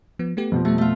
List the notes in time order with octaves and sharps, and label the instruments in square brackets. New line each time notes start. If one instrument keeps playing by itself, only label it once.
[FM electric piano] F3 B3
A3 B3 G4
[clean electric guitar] F2 B2 F3
[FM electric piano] G3 A4 [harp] A3
[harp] A3 F4